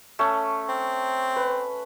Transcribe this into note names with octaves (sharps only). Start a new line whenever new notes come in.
A3 C#4
C4
B4